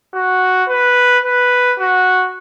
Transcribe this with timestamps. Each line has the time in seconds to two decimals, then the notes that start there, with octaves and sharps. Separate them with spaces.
0.14 F#4
0.69 B4
1.25 B4
1.79 F#4